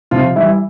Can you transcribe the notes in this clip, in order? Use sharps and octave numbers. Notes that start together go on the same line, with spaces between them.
C3 F3 F4
E3 G3 E4